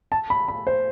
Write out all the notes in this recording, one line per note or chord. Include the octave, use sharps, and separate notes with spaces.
A5
B5
B5
C5